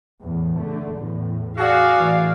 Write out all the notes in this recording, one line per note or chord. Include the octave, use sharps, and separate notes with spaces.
E2 A2
D3 A3
E2 A2
F#4 G#4 D5 F5
A2 E3